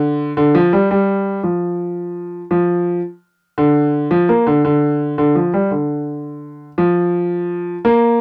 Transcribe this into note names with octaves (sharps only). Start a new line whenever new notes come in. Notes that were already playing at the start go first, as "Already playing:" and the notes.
Already playing: D3
D3
F3
G3
G3
F3
F3
D3
F3
A#3
D3
D3
D3
F3
G3
D3
F3
A#3